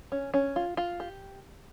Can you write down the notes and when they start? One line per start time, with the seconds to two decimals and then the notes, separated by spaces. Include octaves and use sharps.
0.12 C#4
0.34 C#4
0.56 F4
0.77 F4
1.00 G4